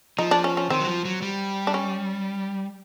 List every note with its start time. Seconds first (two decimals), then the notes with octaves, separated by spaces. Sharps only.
0.18 F3 D#4
0.31 D4
0.44 C#4
0.57 C#4
0.70 D#3 C4
0.80 F#3
0.87 F3
1.05 F#3
1.22 G3
1.67 D4
1.74 C#4